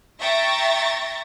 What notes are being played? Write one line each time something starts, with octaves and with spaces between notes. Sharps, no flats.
E5 G5 A#5 C#6 A6 A#6